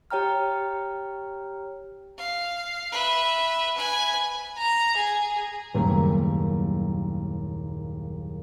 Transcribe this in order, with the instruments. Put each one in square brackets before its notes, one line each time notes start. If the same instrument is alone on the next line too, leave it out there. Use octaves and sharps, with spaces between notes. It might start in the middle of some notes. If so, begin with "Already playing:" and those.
[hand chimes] G4 C#5 G5 A#5 F6
[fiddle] F5
B4 E5
B4 G#5
[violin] A#5
G#4
[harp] F#1 D#2 A#2 G3 A3 A#3